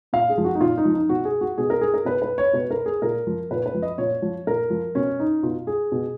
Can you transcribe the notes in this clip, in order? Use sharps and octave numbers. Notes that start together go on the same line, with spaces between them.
A#2 F5
G#4
F3
F#4
D#4
A#2 F4
D#4
F3
D#4
B2 F#4
G#4
F#4
B2 G#4
A#4
G#4
A#4
B2 B4
B4
C#5
B2 B4
A#4
G#4
A#2 A#4
F3
A#2 B4
B4
F3
D#5
A#2 C#5
F3
A#2 A#4
F3
B2 C#4
D#4
B2 F4
G#4
B2